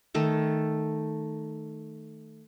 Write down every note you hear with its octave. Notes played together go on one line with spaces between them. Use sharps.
D#3 A3 A4